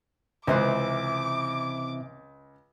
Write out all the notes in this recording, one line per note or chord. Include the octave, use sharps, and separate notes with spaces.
C#2 C3 E3 C5 D6 F#6